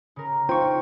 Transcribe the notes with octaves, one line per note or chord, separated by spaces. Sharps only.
C#3 A#4
D#4 F4 C5 G5 C#6